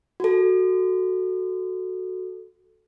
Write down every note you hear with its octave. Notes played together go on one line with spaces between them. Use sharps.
F#4 A4